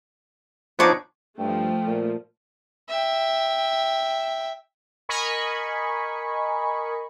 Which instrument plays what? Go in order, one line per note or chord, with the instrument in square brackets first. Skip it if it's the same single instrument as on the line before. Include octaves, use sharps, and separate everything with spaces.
[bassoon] F3 [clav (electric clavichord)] B3 D4 D#4 [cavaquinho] B4 C#5 D6
[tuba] G2 [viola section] F3 A3 [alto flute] G5
[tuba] A#2
[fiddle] E5 G5
[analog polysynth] A#4 D#5 G#5 B5 C#6